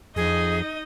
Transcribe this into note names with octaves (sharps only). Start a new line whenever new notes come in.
F2 D#4 G#4 D#5